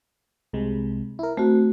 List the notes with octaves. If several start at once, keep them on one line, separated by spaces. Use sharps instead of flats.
C2 C3 G#3
E4 A#4
A3 C4 F#4